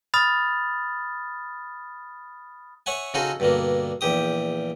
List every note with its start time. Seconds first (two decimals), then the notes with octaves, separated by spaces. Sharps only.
0.14 B5 D#6 F6 A6
2.86 C#5 E5 F#5 G#5
3.14 C#3 D#4 F4 F#4 G#4 A4
3.40 G2 B2 D3 A#3
4.01 A#1 E2 G4 D#6